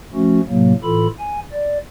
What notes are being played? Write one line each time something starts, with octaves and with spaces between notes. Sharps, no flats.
F3 A3 C#4 F#4
A2 C3 F#3 A#3
A2 E3 F4 A4 B5
G#5
D5